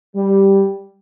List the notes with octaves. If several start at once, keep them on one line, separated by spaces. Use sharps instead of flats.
G3